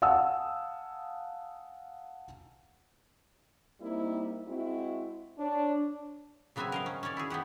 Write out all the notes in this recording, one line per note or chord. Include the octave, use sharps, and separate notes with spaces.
F5 F#5 G#5 A5 D#6 E6
G3 A#3 C4 D#4 E4
G#3 C4 E4 F#4
D4 C#5
C#3 F#3 B3 C4 E5 G#5
A#4 D#5 F5
C#4
C#4 D#4 C#5 D5
E4 F#4 G#4
B3 D#4 G4 F#5